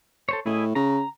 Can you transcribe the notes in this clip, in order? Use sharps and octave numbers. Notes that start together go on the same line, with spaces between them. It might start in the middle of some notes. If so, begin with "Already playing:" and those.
A4 C5 C#5
A2 E4 G#4 D#5
C#3 A#5